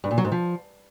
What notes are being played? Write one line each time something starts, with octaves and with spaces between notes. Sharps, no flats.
G2
A#2
F#3
G#2
F3